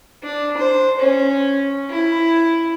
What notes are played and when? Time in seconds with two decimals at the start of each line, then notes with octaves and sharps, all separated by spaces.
0.23 D4
0.57 C5
0.99 C#4
1.90 E4